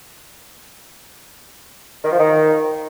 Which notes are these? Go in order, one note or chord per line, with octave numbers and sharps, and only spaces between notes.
D#3
F3
D#3